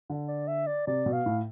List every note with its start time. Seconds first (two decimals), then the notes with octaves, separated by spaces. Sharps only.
0.10 D3
0.28 D5
0.48 E5
0.67 D5
0.87 C3 D5
1.06 B2
1.13 F5
1.26 A2